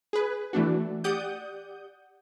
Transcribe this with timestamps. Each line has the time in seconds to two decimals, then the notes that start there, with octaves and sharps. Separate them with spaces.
0.13 G#4 B4
0.53 E3 A3 D4 F#4
1.04 G4 D5 F#5 D#6 G6